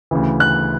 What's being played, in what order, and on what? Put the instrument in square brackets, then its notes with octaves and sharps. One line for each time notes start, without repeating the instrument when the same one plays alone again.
[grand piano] D2 C#3 E3
F#6